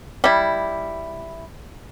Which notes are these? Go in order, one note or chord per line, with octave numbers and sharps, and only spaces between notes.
G3 E4